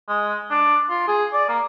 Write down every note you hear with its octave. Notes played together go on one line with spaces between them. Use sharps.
G#3
D4
F4
G#4
D5
A#3